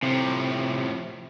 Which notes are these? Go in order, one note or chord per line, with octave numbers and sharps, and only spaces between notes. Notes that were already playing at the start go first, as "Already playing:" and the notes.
A2 C3 F3